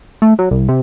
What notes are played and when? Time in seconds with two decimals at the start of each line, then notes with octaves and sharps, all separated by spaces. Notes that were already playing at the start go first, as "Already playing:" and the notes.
0.22 A3
0.39 F#3
0.51 C2
0.69 C3